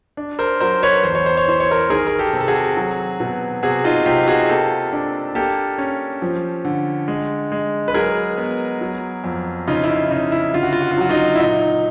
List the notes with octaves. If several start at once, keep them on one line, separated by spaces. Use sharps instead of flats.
D4
A#4 C5
F#3 A#4 C5
B4 C#5
E2 C5
C#5
C5
C#5
E3 C5
C#5
A#4 C5
D#3 G#4 A#4
A#4
G4 A4
C3
A4
F#4 G#4
F#3
B2
C3 F#4 G#4
D#4 F4
C3 F4 G4
F#4 G#4
A#3 G4 A4
D4
A#3 G4 A4
C#4
F3
D3
G#3
G#3
B4
F#3 G#4 A#4
B3
F#3
F2
C#3 D#4 F4
E4
D#4
C#3 D#4
E4
D3 F4
F#4
F4
F#4
F4
F#3 F#4
D#4 F4
E4
A#2 D#4